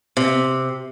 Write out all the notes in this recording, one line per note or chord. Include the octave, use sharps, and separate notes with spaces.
C3